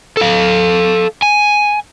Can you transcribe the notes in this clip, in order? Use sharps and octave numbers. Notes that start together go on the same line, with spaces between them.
A4 F5
G#5